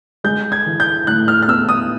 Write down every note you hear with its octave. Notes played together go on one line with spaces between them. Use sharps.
G#3 G6
G#6
E3
G6
A2 F#6
F6
F6
B3 E6
D#6